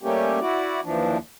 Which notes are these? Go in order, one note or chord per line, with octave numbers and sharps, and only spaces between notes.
G3 A3 A#3 C#4 G4
E4 F#4 D5
D#2 E3 F3 D4